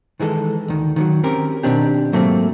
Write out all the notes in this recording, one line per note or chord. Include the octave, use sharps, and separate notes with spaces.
D#3 E3 G#3 G#4 A4
D2 D#3
D#3 E3 F#3
C4 C#4 G4 A#4
B2 D#3 C4 D4 G4
G#2 F#3 A3 A#3 C4